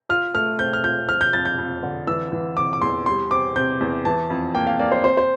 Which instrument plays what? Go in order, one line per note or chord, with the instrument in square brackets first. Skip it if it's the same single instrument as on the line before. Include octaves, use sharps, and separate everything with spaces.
[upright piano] F4 [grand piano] F6
[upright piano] A3 [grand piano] F6
[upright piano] C4 [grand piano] G6
[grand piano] F6
[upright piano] F4 [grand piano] G6
[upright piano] F3 [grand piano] F6
[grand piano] G6
[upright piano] F2 [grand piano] A6
[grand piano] G6
[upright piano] F2
D3
[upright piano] E3 [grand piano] E6
[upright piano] E3
[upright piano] C3 [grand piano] D6
[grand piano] D6
[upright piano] E2 [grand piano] C6
[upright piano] G3 [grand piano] C6
[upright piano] C4 [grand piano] D6
[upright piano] C3 [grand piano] G6
[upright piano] E2
[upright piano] E3 [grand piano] A5
[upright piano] F2
[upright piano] A#3 [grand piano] G5
[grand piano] F5
[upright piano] A#3 [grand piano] D5
[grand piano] C5
[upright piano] C4 [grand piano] C5
[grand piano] C5